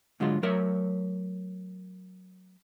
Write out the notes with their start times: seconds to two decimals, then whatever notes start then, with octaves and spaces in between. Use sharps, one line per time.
0.20 G#2 D3 F#3 G#3 F4
0.43 F#3 A3 A#4 C#5 E5